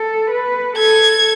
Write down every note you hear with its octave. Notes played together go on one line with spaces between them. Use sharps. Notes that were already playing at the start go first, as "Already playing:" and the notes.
Already playing: A4
B4
A4 G#6